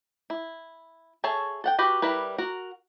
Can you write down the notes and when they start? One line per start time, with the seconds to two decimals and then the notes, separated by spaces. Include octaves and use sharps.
0.30 E4
1.24 G#4 A4 C#5 E5 A5
1.64 A4 F#5 G5
1.79 F#4 G4 B4
2.02 G3 E4 A#4 B4
2.38 F#4 A#4 F#5